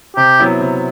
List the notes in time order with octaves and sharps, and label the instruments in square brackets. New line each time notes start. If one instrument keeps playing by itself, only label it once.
[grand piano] C3 [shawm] G4
[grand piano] F#3 B3 E4
C3